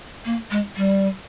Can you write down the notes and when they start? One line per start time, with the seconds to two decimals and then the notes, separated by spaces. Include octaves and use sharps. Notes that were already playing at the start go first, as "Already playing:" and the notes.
0.25 A#3
0.51 G#3
0.76 G3